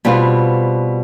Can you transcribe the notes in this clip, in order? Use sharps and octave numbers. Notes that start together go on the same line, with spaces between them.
B2 G3 C4 F4